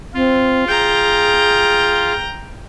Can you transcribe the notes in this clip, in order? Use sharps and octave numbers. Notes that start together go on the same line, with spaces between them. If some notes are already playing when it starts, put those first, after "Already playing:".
C4 F4
G#4 G5 A#5